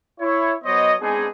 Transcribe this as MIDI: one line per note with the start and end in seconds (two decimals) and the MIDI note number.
0.20 0.53 64
0.20 0.53 73
0.64 0.94 54
0.64 0.94 59
0.64 0.94 72
0.64 0.94 73
0.64 0.94 75
1.01 1.27 56
1.01 1.27 59
1.01 1.27 60
1.01 1.27 62
1.01 1.27 63
1.01 1.27 68